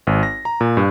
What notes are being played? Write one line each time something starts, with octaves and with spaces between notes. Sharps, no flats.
G#1
A#6
A#5
A#2
G2